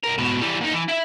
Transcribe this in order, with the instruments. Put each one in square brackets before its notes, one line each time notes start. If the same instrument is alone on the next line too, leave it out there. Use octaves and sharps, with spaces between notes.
[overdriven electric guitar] B1 A#4
G#2 B2
E3 G3
A#2 D#4
E3
E4 E5